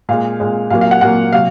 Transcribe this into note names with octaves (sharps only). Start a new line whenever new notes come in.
A#2 G#3 F5
A#2 G#3
A#2 F#3 A#3 F5
F5
F#5
A#2 F#3 A#3 F#5
C3 F#3 A#3 F5